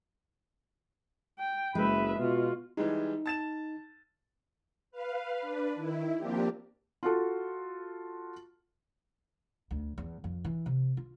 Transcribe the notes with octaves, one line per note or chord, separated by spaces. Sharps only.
G5
F#1 G#3 B4 E5
B2 F4 F#4
E3 G3 G#3 D#4
A5 A6 E7
B4 F5
D4 B4
D#3 E4
F3 A#3 C4 D4 G4
F4 F#4 A4
D2
E2
F2
E3
C3
F4